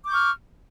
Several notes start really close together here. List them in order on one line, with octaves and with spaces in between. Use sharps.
D6 G6 C#6 F6